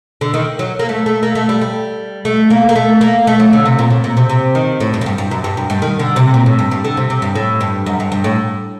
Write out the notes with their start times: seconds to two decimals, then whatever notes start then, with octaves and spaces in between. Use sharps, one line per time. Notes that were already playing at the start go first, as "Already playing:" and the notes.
0.21 D3
0.34 D#3
0.59 F#3
0.79 A#3
0.89 A3
1.06 A3
1.23 A#3
1.35 A3
1.49 G3
1.61 G3
2.25 A3
2.50 A#3
2.69 A#3
2.76 A3
3.01 A#3
3.27 A3
3.40 F#3
3.53 D3
3.66 C3
3.79 A#2
3.90 A2
4.04 A#2
4.17 C3
4.29 C3
4.55 D#3
4.80 A2
4.94 G2
5.01 F#2
5.06 G2
5.18 G2
5.31 F#2
5.44 G2
5.57 F#2
5.70 G2
5.82 D#3
5.99 D3
6.16 C3
6.34 A#2
6.46 A2
6.59 G2
6.71 G2
6.85 D3
6.97 C3
7.10 C3
7.22 G2
7.35 A2
7.61 G2
7.86 F#2
8.00 G2
8.12 G2
8.24 A2